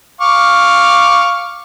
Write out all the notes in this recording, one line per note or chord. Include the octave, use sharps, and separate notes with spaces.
F5 C#6 D6